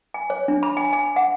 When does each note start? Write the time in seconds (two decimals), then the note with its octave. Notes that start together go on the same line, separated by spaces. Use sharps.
0.14 G#5
0.30 C#5
0.48 D4
0.63 B5
0.77 G#5
0.93 G#5
1.16 F#5